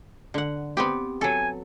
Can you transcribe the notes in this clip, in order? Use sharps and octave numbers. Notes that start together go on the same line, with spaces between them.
D3 F#5
B3 C4 G4
F#3 A4 G#5